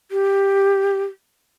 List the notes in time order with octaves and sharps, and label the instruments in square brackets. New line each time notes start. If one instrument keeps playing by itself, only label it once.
[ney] G4